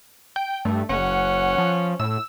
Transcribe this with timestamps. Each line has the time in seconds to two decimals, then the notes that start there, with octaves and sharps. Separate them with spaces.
0.36 G5
0.65 G2 A3
0.89 F#1 C#4 F#5
1.58 F3
2.00 A2 E6